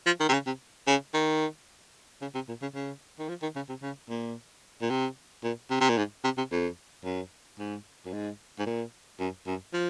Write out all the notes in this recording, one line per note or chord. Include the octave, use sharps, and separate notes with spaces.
F3
D#3
C3
C#3
C3
C#3
D#3
C#3
C3
A#2
C#3
C#3
D#3
F3
D#3
C#3
C3
C#3
A#2
A#2
C3
A#2
C3
C3
A#2
G#2
C3
C3
F2
F#2
G#2
F#2
G#2
G#2
A#2
F#2
F#2
F3